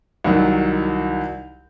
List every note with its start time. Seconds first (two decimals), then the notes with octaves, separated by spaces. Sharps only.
0.24 C2 D#3 F#3